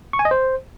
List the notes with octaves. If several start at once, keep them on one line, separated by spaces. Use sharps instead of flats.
C#6
G#5
D#5
C5